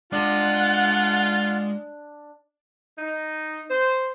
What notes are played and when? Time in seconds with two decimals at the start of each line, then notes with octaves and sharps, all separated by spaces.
0.12 G#3 D4 F4 F#5
2.98 D#4
3.69 C5